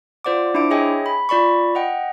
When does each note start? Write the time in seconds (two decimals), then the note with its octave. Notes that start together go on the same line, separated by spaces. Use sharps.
0.25 F4 C5 D5 F#5 D6
0.54 D4 E4 C5 E5 D6 D7
0.71 G#4 C#5 D#5 E5 G5 G#5
1.06 B5
1.29 F4 D5 B5 C#6
1.75 D#5 F#5 G5